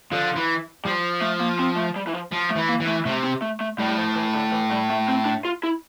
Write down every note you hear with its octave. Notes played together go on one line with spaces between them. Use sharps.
D3 F3
E3
F3 G3
A3
A#3
C4
A3
G3
E3
F3
F3
A3
E3
A#3
E3
A3
C3 A3
C4
A3
A3
A2 G3
G3
F3
E3
D3
E3
G3
A3
C4
D4
F4
E4